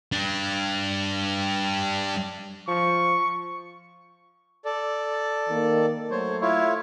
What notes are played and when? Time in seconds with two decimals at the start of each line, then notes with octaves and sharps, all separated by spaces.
0.12 G3 D4
2.68 F3 C#6
4.65 A4 D5
5.49 D#3 A#3
6.11 F#3 A3 C5 C#5
6.41 E4 F4 C#5